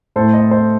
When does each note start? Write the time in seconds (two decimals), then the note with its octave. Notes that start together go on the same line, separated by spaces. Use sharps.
0.16 A2 A3 A4 C5
0.33 C5 D#5
0.51 C5 D#5